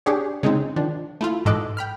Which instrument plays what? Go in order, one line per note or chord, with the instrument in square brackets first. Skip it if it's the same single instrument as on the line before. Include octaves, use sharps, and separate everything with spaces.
[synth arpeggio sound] D4 G4 G#4 C#5
C#3 G#3 C4 D#4
D#3 F3 D4
A3 E4 F4
A1 G#2 A4 D#5 D6 F#6
G5 B5 F6